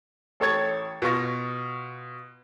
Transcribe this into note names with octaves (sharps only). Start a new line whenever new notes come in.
A1 A4 C#5 G#6 A6
B2 B3 F4 C#6 A#6